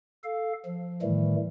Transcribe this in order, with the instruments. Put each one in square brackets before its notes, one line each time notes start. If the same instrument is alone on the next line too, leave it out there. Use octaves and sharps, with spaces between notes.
[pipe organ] A4 F5
F3
A2 D#3 E3 G3 A3